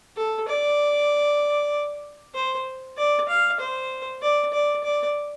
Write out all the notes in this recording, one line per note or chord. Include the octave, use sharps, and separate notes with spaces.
A4
D5
C5
D5
F5
C5
D5
D5
D5